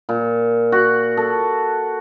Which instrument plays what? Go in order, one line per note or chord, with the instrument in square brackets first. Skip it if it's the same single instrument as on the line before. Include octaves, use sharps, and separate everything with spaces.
[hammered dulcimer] A#2
F#4
A4